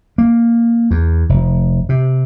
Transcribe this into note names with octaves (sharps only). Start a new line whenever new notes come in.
A#3
E2
F1
C3